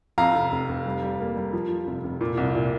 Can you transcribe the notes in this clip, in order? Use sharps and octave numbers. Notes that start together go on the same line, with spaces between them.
F2 F5 A#5
F1
F1
F1
G3
G3
A#3
G3
F3
F3
F1
F1
A#2
C2
A#2